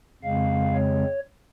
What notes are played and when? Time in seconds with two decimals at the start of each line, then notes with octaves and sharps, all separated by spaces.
0.23 F2 C#3 G#3 C4 F5
0.74 C#5